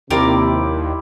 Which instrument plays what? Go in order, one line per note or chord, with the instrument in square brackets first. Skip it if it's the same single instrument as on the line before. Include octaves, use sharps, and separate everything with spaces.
[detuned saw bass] D#2 [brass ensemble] C3 [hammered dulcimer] G3 E4 G4 [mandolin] F4 A#4 D5